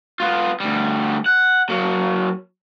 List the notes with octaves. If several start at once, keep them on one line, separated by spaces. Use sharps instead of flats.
B3 F4
D2 G3
F#5
F#3 A#3